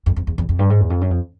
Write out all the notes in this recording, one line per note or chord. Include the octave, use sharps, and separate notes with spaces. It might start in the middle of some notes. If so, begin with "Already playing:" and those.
F2
F2
E2
E2
F2
G2
G#2
E2
F2
F#2
F2